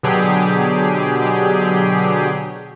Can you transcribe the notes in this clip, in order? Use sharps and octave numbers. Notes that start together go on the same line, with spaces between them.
B2 D3 F#3 G4 G#4